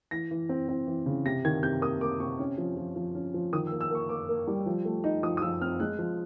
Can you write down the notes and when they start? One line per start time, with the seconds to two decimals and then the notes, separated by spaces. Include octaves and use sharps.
0.11 E3 A#6
0.31 E3
0.49 C4
0.68 C4
0.87 E3
1.06 C#3
1.26 C3 A#6
1.45 D#3 G#6
1.63 C3 G6
1.82 A#3 D#6
2.01 A#3 D6
2.20 C3 C#6
2.39 C#4
2.58 F3
2.77 F3
2.96 F3
3.15 C#4
3.34 F3
3.53 D#3 D#6
3.67 E6
3.72 A#3
3.81 E6
3.91 A#3 C#6
4.09 A#3 D6
4.29 A#3
4.47 G3
4.66 F3
4.85 A3
5.04 D#4
5.23 F3 D#6
5.37 D#6
5.42 F3 E6
5.61 C4 F6
5.80 G#3 F#6
5.99 F3